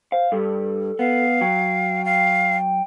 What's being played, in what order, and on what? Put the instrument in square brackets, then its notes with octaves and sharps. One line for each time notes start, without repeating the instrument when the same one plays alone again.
[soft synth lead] C5 [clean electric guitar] F5
[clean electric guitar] G2 G3 [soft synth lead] A4
[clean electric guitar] B3 [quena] F5
[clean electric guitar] F#3 [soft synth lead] G5
[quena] F5